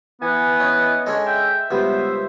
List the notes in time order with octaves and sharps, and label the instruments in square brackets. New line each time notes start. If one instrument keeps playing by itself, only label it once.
[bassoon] E3 [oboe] B3 [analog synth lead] G#5
[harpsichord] C#4 [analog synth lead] D#5
[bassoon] G#3 [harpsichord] C#4 D4 A4
[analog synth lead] E5 [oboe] G5
[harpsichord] C#2 G3 [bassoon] B3 [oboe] C5